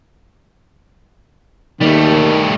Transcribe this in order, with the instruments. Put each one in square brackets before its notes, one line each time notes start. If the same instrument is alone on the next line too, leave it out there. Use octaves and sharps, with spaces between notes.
[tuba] D#2 [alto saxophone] D#3 [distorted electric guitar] G3 A3